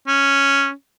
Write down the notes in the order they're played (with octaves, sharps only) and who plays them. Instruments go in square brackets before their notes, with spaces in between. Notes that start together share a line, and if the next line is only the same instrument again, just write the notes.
[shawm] C#4